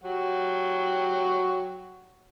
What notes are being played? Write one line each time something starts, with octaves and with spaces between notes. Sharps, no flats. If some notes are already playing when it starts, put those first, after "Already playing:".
F#3 F#4 G4